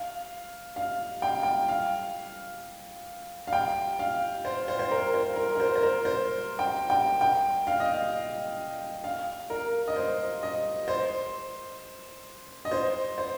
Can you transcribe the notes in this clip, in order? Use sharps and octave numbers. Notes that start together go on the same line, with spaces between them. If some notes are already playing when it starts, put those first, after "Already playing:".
Already playing: F5
F5
G5
G5
F5
F5
G5
F5
C5
C5
C5
A#4
C5
A#4
A#4
C5
C5
A#4
C5
G5
G5
G5
F5
D#5
F5
F5
A#4
D#5
C5
D#5
C5
D#5
C5
C5